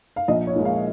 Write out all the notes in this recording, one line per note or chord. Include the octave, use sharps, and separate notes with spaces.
F5
A#1 D#5
C#5
A#2 F3 G#3
F5